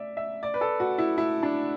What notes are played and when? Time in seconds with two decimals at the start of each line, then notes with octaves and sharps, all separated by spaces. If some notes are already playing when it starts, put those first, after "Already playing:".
Already playing: D5 E5
0.17 E5
0.43 D5
0.54 B4
0.61 A4
0.80 F#4
0.98 E4
1.18 E4
1.43 D4